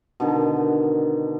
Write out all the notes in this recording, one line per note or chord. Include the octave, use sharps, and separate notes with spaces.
B2 D3 D#3